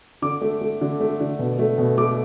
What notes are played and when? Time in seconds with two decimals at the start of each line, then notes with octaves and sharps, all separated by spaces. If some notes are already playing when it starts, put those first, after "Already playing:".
0.22 D3 D6
0.41 A3
0.61 A3
0.81 D3
1.01 A3
1.21 D3
1.39 B2
1.59 A3
1.78 B2
1.98 A3 D6